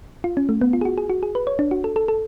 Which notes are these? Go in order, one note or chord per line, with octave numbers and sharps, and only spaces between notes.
F4
C#4
A3
B3
F4
G#4
F#4
G#4
F#4
G#4
B4
C#5
D4
F#4
A4
A4
A4